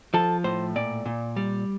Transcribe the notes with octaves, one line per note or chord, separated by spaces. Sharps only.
F3 A4
A2 C5
A#2 D5
A#2
G3